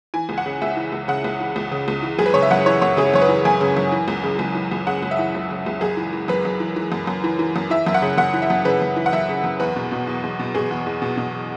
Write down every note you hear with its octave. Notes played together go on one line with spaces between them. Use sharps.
E3 G#5
C#2
F#5
C#3
C#2 E5
E3
C#2
C#3 F#5
C#2
E3
C#2
C#3
C#2
E3
F#2 G#4
B4
C#3 C#5
E5
F#2 F#5
E3 C#5
F#2 C#5
C#3 G#4
F#2 C#5
B4
E3
F#2 G#5
C#3
F#2
E3
C#2
C#3
C#2
E3
C#2
C#3 F#5
C#2
E5
E3
C#2
C#3
C#2
F#2 G#4
E3
E3
F#2 B4
F#2
E3
E3
F#2
F#2
E3
E3
F#2
E3 E5
F#2 E5
F#5
C#3
F#2 F#5
E3
E5
F#2
C#3 B4
F#2
E3
F#5
F#2 E5
C#3
F#2
E2 B4
B2
B2
E2
E2
B2
B2 G#4
E2
E2
B2
B2